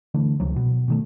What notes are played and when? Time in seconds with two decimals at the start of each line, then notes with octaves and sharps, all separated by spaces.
0.14 D3 E3 A3
0.40 C#2 C3 F3 F#3
0.56 B2
0.88 B2 D#3 A3